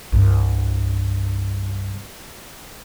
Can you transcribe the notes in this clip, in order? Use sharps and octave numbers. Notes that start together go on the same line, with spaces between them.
C2 G2